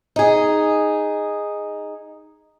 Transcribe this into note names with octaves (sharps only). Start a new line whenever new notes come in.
D#4 G#4